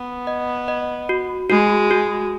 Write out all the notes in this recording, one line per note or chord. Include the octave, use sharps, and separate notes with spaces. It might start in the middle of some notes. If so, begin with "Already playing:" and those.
Already playing: B3
D#5
D#5
F#4
G#3 F#4
F#4